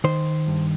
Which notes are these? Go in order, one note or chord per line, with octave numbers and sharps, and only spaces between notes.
D#3 C5
G2